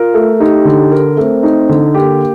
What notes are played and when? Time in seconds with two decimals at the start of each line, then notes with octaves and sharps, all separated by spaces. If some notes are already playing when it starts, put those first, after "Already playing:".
Already playing: F4 A#4
0.14 A3
0.40 D#4 G4
0.65 D3
0.92 A#4
1.17 A3 C4
1.43 D#4
1.69 D3
1.95 A#3 G4